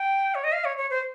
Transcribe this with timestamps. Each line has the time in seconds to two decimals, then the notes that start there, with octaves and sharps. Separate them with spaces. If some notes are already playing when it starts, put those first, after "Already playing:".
Already playing: G5
0.35 C#5
0.44 D#5
0.53 F5
0.65 C#5
0.78 C#5
0.90 C5